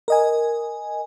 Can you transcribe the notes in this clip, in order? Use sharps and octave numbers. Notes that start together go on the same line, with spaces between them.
A#4 D#5 G#5